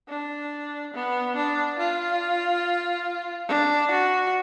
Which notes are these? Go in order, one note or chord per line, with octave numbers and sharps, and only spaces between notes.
D4
B3
D4
F4
D4
F#4